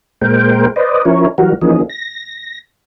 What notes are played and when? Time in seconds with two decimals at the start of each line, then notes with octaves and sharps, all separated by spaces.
0.21 A#2 G#3 A#4 C5 G5
0.76 B4 C5 D5 D#5
1.05 F3 C#4 E4 A#4 C#5
1.38 E3 F#3 G3 F#4 A#4
1.62 E3 F3 A#3 C#4 D#4 G#4
1.90 A#6